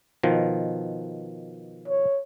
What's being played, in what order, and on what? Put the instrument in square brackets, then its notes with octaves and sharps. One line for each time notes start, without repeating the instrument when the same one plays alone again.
[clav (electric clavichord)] B2 D#3 F3
[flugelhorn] C#5